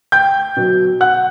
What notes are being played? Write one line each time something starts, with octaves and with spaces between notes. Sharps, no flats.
G5 G6
B2 F#3
F#5 F#6